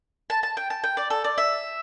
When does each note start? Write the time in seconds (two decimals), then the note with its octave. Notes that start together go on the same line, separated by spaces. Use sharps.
0.30 A5
0.43 A5
0.57 G5
0.70 A5
0.84 G5
0.97 D5
1.10 A4
1.24 D5
1.38 E5